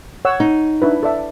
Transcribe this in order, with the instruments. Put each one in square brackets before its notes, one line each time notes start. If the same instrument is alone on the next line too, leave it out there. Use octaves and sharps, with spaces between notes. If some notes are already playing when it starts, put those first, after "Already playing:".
[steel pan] C#5 F#5 E6
[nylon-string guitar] D#4
[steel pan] D4 E4 B4
A4 D5 E5